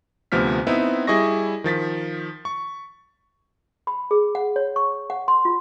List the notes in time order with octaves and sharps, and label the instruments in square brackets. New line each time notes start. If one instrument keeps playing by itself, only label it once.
[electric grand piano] D2 C3 F3 B3 F6 B6
B3 C4 D#4 E4 E5
G3 E4 G#4 D#5 C#6 A#6
D#3 F3 A6 B6
C#6
[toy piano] B5
G#4
F#5
C#5
C#6
F#5
C6
F4